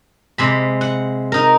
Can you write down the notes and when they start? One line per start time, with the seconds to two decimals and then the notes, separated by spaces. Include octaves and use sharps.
0.38 C3 G#3 B5
0.81 F#5
1.32 D#4 A#4